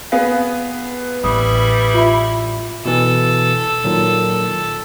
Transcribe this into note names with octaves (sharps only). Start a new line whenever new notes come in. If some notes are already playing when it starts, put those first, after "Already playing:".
B3 G#4 B4 F5
A1 G3 E4 D#6
F4 E5 B5
B2 E3 A4
A#2 D#3 F#3